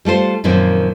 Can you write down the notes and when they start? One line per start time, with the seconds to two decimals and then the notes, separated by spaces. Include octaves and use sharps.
0.05 G3 A3 F4 C5
0.44 F#2 A#2 D#3 F3 A#3 C4